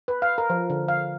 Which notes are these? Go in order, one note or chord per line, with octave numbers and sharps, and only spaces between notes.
B4
F5
A#4
F3
D3
F5